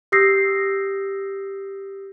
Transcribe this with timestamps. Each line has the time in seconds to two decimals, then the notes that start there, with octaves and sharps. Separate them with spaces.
0.12 G4 D#6 E6 G6 A#6 C7